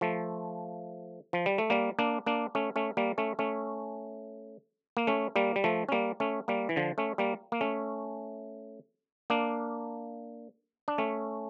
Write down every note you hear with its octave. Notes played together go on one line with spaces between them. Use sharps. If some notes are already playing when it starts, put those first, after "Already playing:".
F3 A3
F3
G3
A3
G3 A#3
A#3 D4
A#3 D4
A3 C#4
A3 C#4
G3 A#3
A3 C#4
A3 C#4
A#3
A3 C#4
G3 A#3
G3
F3 A3
C#4
G3 A#3
A3 C#4
G3 A#3
E3
D3 F3
A3 C#4
G3 A#3
A#3
A3 C#4
A#3 D4
D4
A3 C#4